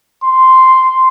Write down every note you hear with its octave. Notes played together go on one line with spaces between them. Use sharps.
C6